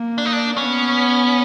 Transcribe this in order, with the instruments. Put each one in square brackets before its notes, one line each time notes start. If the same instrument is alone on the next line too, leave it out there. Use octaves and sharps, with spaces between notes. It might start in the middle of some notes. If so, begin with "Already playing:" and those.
Already playing: [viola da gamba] A#3
[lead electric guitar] D4
D#4
D4
[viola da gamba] B3 [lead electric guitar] C#4